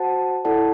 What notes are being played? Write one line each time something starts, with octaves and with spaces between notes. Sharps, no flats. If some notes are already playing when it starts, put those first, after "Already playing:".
Already playing: F#4 C5 F#5 A5
E4 A4 D5 F#5 A5